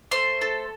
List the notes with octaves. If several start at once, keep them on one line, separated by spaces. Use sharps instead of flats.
A3 C5 C6
A4